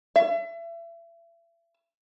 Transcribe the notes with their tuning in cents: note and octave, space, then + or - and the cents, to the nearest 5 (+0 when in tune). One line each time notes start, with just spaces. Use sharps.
E5 +35